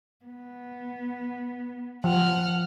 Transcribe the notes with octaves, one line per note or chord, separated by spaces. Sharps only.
B3
F3 F#5 F6